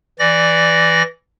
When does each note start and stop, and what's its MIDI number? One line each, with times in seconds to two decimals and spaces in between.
0.19 1.03 52
0.19 1.03 74
0.19 1.03 94